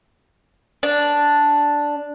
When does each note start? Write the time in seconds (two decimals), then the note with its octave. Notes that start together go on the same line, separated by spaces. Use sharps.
0.83 D4